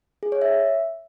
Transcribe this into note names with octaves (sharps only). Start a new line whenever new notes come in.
G#4
C#5
E5